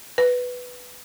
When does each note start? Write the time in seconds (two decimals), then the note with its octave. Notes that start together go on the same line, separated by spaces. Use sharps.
0.18 B4